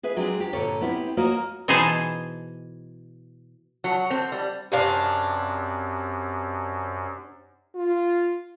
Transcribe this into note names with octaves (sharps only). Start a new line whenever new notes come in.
G#4 B4 E5
F#3 G#3 C4 D4 G#4
G4
G2 A#2 D3 A4 C#5
B3 C4 E4 G4
A#3 F#4 A#4 C#5 D#5
B2 E3 D#4 G#4 C5 A5
F#3
C4
G3
F#2 C3 D4 F5
F4